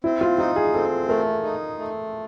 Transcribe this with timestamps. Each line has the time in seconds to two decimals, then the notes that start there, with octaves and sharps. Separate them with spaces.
0.04 C4 E4
0.21 F4
0.38 D#4 F4
0.56 G#4
0.74 C4 A4
1.08 A3 A#4
1.43 D#4
1.78 A3